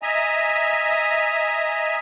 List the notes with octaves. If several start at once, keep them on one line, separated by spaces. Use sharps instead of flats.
D#5 E5 G#5 A#5